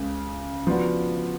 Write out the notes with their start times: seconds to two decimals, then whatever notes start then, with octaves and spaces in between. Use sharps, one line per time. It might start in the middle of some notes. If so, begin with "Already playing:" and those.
Already playing: C#2 C#3
0.67 F3 B3 D4 F#4